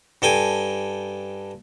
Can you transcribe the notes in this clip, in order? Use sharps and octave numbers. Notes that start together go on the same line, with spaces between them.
G2 A4 G5 G#5